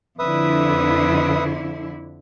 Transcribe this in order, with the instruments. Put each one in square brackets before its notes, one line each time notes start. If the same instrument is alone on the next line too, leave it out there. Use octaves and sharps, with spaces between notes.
[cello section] F2 D3 E4 [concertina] B4 E5 D#6